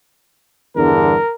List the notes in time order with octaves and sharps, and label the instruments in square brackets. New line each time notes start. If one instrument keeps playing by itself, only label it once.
[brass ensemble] E2 G2 D3 [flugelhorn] A#4